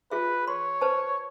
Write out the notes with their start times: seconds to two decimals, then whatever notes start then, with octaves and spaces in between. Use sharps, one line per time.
0.11 F4 G#4 B4 E5
0.48 C#5 C6
0.81 B4 C5 A5